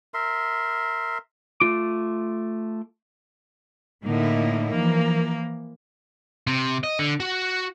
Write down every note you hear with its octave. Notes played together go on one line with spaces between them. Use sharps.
A#4 E5 C6
A3 F4 D6
A2 D3 A#3 D#4 E4
E3 F3 A#3
C3
D#5
D3
F#4